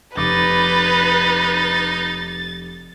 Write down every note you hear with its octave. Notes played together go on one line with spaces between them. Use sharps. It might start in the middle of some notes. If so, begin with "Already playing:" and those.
F1 D#4 B4 D6 A6